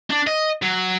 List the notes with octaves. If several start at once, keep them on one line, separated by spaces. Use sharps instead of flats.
D4
D#5
F#3